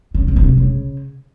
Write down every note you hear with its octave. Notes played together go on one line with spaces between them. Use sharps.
C#3
C#3
C3
C#3